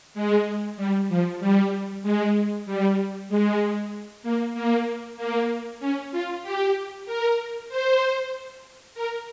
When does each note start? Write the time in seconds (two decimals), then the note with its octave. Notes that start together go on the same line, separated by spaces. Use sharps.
0.14 G#3
0.77 G3
1.09 F3
1.40 G3
2.03 G#3
2.66 G3
3.29 G#3
4.23 A#3
4.54 A#3
5.17 A#3
5.80 C#4
6.12 F4
6.43 G4
7.06 A#4
7.69 C5
8.95 A#4